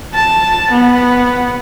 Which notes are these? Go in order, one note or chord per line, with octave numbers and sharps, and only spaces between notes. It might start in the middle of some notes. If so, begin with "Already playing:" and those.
A5
B3